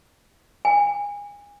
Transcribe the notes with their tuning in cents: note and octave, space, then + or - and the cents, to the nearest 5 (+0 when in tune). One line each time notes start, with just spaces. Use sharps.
G#5 -30